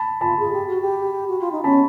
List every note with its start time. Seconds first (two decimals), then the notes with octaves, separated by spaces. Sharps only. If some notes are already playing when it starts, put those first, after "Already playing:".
Already playing: A5 B5
0.21 F4 A5 B5
0.39 G#4
0.53 G4
0.67 F#4
0.81 G4
1.28 F#4
1.41 F4
1.52 D#4
1.64 C#4 A5 B5